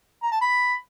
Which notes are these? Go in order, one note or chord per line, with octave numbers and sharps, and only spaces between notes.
A#5
A5
B5